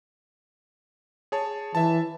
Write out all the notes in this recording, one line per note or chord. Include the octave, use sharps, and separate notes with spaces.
G#4 C#5 A5
E3 E5 A5